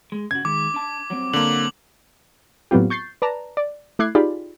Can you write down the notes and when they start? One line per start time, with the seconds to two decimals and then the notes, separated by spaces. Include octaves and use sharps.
0.12 G#3
0.31 C#3 F#4 G#6
0.45 D#3 G#3 D6
0.74 D4 A5
1.10 F#3 G3 C4
1.33 D3 A#3 F#7
2.71 A2 F#3 B3 C4 F4 G4
2.90 C#6 G6 A6 C7
3.22 B4 D5 A5 A#5
3.57 D5
3.99 A3 E4 D6 F#6 G#6 C7
4.15 D#4 F4 G4 G#4 D5 B5